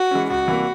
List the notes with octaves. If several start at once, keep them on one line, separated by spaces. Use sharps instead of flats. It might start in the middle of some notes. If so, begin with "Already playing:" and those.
Already playing: F#4
E3 G#3 C#4
C#2 F#4
C3 E3 G3 A#3